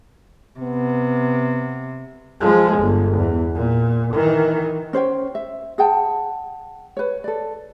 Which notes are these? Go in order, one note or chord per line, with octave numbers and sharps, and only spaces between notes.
C3 B3
F3 G#3
G1
E2
A#2
D#3 E3
C#4 C5 C#5 G5
E5
G#4 F#5 G5 A5
B4 C#5
A4 D5